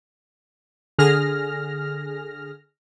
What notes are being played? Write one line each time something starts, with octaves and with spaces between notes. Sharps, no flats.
D3 G#4 F6 A#6